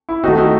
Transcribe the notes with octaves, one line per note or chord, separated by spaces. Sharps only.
E4
D#3 A3 D#4 F#4
D#4 F#4